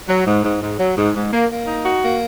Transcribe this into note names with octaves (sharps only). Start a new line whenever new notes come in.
F#3
G#2
G#2
G#2
F#3
G#2
G#2
A#3
A#3
D#4
F#4
A#3